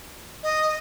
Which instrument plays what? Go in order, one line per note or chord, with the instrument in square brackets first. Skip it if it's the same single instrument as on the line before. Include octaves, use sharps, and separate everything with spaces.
[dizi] D#5